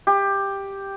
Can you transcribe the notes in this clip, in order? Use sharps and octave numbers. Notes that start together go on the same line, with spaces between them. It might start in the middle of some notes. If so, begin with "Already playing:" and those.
G4